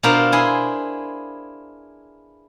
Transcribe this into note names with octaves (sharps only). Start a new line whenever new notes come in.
B2 D4 F4 A#4 C5 A#5
E4 G#4 C6